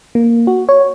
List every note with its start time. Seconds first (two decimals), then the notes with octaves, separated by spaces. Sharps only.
0.15 A#3
0.47 F#4
0.69 C#5